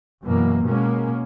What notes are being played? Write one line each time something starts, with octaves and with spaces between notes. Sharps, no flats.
F#2 B2 E3 A#3
B2 G#3 A#3 C#4